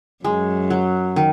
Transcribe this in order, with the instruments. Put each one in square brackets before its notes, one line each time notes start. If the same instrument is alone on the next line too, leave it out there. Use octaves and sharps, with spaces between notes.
[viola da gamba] F#2 [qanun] G#3
[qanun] F#3
D#3